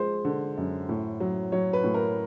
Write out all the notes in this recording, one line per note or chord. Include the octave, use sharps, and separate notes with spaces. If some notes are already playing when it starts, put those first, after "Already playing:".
Already playing: F3 G#3 C5
D3
F#2
A2
F#3
F#3 C#5
B4
A2
A#4